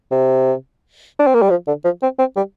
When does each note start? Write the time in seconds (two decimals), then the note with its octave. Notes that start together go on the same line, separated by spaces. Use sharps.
0.11 C3
1.19 D4
1.27 C4
1.34 A#3
1.42 G3
1.50 F3
1.67 D3
1.85 F3
2.02 C4
2.19 C4
2.36 G3